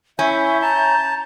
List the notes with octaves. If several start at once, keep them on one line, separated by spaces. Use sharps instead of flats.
C#4 E4 E5 G6
A5 A#5